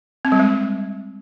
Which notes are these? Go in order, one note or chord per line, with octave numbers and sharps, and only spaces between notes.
C4
G3
G#3